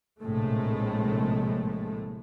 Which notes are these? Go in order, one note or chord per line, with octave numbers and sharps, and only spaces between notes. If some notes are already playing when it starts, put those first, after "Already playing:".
A#1 A2 C3 G#3 A3